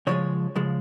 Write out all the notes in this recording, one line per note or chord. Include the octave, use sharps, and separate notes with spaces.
C#3 F3 G#3 C#5
C#3 F3 G#3